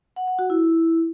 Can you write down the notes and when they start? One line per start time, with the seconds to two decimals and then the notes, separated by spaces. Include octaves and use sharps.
0.16 F#5
0.28 F#5
0.39 F#4
0.50 E4